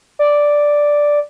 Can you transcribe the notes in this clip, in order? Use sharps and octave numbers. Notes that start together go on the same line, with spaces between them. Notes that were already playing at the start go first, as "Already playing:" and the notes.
D5